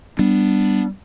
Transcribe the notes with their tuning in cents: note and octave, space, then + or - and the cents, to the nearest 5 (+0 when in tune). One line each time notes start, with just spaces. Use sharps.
G3 +0 B3 +0 D4 +0